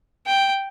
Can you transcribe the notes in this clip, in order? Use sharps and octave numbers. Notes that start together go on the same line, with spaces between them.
G5